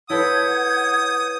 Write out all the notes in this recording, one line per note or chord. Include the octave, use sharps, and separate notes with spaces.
E4 A4 B4 C#5 F#5 D#6 G6 G#6